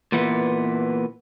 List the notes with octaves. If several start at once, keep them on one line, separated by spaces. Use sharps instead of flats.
A#2 E3 B3